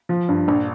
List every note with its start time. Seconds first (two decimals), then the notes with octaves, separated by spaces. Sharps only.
0.09 F3
0.29 G2
0.48 A#1